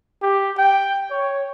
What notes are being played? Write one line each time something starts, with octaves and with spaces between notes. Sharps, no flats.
G4
G5
C#5